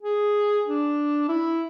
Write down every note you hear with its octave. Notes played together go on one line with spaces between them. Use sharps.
G#4
D4
E4